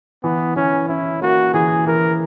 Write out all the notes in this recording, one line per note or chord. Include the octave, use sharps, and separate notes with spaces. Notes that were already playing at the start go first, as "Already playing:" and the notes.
E3 B3
E3 C#4
C#4 E4
A#3 F#4
E3 G#4
E3 A#4